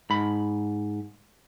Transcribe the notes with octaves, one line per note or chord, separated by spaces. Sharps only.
G#2 B5